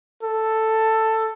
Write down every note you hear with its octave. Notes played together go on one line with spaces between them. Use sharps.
A4